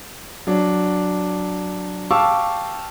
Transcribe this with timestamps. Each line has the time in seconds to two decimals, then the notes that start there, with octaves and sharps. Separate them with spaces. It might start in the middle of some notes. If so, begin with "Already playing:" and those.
0.47 F#3 D4
2.11 G4 F5 A5 C#6 D6 E6